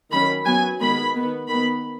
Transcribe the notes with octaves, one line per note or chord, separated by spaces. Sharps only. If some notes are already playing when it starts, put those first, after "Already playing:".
D#3 F#3 C#4 B5
F#3 B3 G#5
D#3 G#3 B3 B5
D#3 B3
D#3 B3 B5